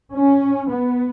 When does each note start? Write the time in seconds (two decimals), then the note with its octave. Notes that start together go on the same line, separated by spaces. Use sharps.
0.15 C#4
0.70 B3